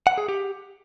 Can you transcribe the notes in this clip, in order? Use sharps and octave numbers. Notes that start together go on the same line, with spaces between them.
F#5
G#4
G4